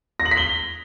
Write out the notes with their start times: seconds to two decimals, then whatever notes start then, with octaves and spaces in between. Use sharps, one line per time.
0.20 A#6
0.25 F#7
0.31 B6
0.37 G7